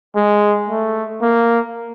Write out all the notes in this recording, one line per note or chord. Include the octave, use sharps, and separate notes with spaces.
G#3
A3
A#3